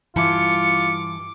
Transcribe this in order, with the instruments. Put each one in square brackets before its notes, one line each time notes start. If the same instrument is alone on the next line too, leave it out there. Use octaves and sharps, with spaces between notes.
[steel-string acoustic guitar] G2 E3 A5 [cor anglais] F4 [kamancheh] D6 [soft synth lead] C#7